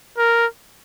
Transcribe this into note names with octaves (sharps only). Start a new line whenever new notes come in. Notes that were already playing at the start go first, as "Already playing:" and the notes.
A#4